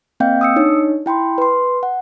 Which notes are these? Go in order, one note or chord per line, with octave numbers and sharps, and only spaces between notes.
A#3 C4 D#5 F5 G5 G6
D#6 E6 C#7
D4 D#4 C#5
E4 G5 B5 C6
B4 C6
F#5